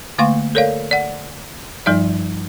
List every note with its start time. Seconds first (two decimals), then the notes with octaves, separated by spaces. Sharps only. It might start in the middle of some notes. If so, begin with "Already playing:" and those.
0.18 D3 A3 A#3 F5 C6 C#6
0.55 A4 A#4 C#5 D5 F5
0.91 D5 F#5
1.86 G2 F3 G3 D#4 D5